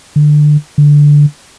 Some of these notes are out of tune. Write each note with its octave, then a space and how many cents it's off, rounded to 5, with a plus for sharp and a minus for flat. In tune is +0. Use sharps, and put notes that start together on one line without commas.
D3 +20
D3 -5